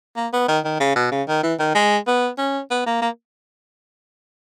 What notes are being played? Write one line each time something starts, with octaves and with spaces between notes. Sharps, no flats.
A#3
B3
D#3
D#3
C#3
B2
C#3
D#3
E3
D#3
G#3
B3
C#4
B3
A#3
A#3